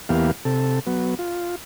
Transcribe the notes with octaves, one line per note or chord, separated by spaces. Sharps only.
E2 E3 A#3 B3 G4 F5
C3 A4
F#3 B3
F4